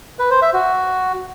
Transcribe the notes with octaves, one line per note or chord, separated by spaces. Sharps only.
B4
C5
E5
F#4